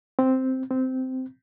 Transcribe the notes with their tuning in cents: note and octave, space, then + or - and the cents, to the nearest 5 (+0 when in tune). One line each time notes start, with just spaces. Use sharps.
C4 -5
C4 -15